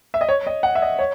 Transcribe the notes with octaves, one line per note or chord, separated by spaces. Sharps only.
E5
D#5
C#5
D#5
F#5
E5
D#5
C#5